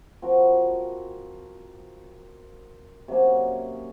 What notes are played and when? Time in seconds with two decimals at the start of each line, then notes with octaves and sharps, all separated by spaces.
0.22 F3 C4 F#4 A#4
3.08 C3 F#3 A#3 C#4